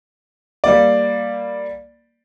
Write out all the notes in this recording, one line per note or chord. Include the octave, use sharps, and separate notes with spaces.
G3 A#3 D5